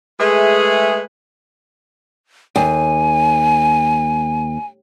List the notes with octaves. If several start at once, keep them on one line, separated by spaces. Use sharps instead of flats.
G#3 A3 G#4 B4 E5
D#2 G#5